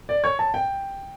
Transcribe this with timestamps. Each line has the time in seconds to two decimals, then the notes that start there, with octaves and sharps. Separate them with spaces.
0.09 D5
0.24 C#5
0.39 A5
0.54 G5